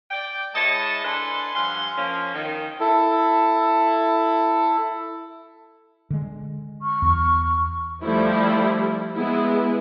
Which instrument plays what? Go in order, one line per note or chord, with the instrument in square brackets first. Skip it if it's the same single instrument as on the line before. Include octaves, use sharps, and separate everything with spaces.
[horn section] D5 G5
G#3 E4 C#5 D#5 A5
D4 A4 B4 G#5 C6
G2 F3 F5 F#5 G#5 C6
F3 A#3 C#4
D#3
[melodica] E4 A4
[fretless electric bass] D3 G#3
[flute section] C#6 F6
[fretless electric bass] E2
[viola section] F3 G3 A3 E4
G#3 B3 E4 G#4